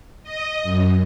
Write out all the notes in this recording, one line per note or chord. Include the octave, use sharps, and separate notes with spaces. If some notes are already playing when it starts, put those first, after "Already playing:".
D#5
F#2